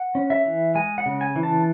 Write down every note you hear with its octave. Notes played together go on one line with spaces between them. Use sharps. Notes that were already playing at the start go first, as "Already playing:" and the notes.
Already playing: F#5
C#4
E5
E3
G#3 G#5
F#5
C#3
G#5
E3
A5